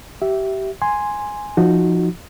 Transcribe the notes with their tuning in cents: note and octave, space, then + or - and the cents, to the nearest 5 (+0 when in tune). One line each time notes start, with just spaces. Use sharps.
G4 -25 E5 +0
G#5 +0 C6 +0
F3 +0 D#4 +0 F#4 +0